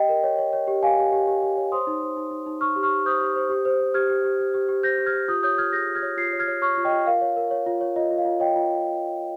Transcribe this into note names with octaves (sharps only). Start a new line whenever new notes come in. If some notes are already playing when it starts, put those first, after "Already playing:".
Already playing: G4 D#5 G5
A#4
C#5
C#5
C#5
G4
G4 F5 G#5
G4
G4
G4
G4
C#5
C5 C6 D#6
D#4
C5
D#4
D#4
D#4
D#4 C#6 F6
G4
C#6 F6
G4
C5 D#6 G6
G4
C5
G4
C5
C5
G4 F6 G#6
G4
G4
G4
G4
G4
C5 G6 A#6
G4
F6 G#6
G4
F4 D#6 G6
C#5 D#6 G6
F4 F6 G#6
G#4 G6 A#6
F4
F6 G#6
C#5
F4 G#6 C7
C#5
F6 G#6
C#5
C#5 C#6 F6
F4
D#5 G5
F4
A#4 F5
C#5
A#4
C#5
F4
C#5
F4 D#5
F4
F5
F4
C#5 D#5 G5
F4